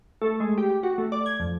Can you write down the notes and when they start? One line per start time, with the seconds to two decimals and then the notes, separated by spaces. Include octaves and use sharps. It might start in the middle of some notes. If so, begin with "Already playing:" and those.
0.22 A3
0.40 G#3
0.58 G4
0.69 G4
0.83 F#4
0.98 A3
1.12 D5
1.26 G#6
1.40 F2